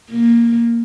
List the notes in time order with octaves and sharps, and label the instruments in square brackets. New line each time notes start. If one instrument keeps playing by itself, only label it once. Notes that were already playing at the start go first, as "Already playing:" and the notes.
[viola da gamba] A#3